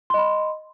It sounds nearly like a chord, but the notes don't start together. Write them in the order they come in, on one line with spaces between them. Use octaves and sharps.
C6 D#5 B5